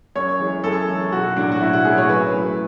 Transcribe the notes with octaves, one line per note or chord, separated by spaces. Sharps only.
F#2 C#5
E3 G#3
F#2 A4
E3 G#3
B1 F#4
A2 F#3 A3 D4
F#4
B1 E4
F#4
A2 F#3 A3 G#4
C#5
F#2 B4
E3 A3